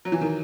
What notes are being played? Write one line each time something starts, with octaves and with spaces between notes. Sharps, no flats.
F#3
E3
D#3